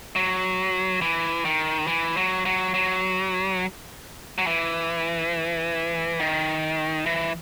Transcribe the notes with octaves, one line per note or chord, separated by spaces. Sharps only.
F#3
E3
D#3
E3
F#3
F#3
F#3
F#3
E3
D#3
E3